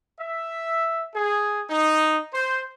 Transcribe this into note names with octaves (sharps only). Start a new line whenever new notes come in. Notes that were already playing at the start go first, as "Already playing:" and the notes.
E5
G#4
D#4
C5